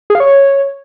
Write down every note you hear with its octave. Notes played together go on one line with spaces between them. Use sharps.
G#4
F5
C#5